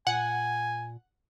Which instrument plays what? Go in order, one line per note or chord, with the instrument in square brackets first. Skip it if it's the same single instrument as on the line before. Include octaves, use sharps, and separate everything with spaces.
[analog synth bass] A#2 [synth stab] F#5 [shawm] G#5